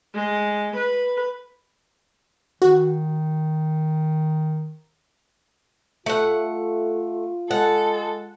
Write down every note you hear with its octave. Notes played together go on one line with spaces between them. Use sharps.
G#3
B4
D#3 F#4
A3 F4 F#5
G#3 A4 F#5